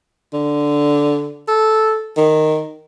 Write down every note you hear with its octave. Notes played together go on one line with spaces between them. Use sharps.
D3
A4
D#3